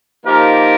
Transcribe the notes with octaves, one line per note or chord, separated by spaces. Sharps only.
F3 A#3 D#4 G4 A#4